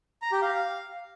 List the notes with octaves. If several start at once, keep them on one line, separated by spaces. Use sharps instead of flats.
A#5
G4
F5